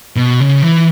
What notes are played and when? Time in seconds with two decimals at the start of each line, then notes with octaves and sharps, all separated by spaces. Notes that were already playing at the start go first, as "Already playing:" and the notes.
0.16 B2
0.40 C#3
0.63 E3